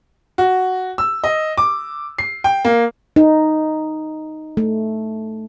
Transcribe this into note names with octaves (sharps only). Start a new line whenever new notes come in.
F#4
E6
D#5
D6
C7
G5
A#3
D#4
A3